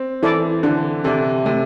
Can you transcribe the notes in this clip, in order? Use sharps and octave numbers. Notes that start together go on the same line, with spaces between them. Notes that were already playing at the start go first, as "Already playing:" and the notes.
Already playing: C4
E3 E4 A4 D5
D3 D4
C3 A4 D5
C3 A3